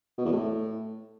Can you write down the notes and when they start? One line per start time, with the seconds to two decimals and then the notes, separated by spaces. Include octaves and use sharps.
0.18 B2
0.25 E2
0.32 A2